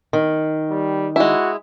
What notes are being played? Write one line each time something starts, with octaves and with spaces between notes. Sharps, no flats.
D#3
G3
G#3 E4 F#4